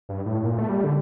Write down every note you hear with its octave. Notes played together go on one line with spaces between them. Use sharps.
G2
A2
A#2
A3
G3
D3